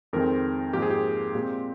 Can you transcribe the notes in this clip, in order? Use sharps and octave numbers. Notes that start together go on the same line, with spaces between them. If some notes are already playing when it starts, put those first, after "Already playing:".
F2 D#3 G#3 C4 A#4
G#2 F3 A#3 G4
G#4
G4
A#2 G#3 C4 G4